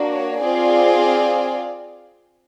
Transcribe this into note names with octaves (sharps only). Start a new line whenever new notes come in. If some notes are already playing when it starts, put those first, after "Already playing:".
Already playing: A#3 D4 F#4
C#5
C4 F4 G#4 D5